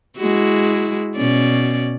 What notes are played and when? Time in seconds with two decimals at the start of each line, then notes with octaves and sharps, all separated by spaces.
0.18 G#3 E4 F#4
1.16 B2 C#4 D5